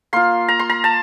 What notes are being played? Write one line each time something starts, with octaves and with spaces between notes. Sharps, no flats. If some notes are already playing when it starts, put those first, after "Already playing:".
A#3 F4 C6
A#5
C6
A#5
A5